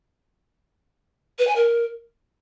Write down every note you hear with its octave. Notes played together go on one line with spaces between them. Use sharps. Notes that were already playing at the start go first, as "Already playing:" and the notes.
B4
G#5
A#4